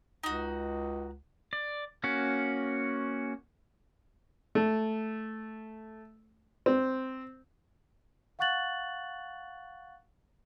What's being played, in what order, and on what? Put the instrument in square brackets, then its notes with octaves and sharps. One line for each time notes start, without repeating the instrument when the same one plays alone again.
[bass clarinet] C#2 [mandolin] D#4 F#4
[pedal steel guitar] D5
A#3 C#4 F#4
[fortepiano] A3
C4
[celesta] F5 F#5 C#6 F#6 A6 F#7